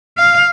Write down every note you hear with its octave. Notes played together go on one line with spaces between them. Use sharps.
F5